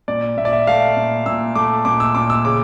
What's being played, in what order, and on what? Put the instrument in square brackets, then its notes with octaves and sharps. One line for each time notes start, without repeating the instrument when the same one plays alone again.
[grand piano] A#2 D5
A#2 E5
D5
E5
A3 F5
A#2
A#2 E6
A3 D6
A#2 D6
E6
A#2 D6
E6
C#3 D6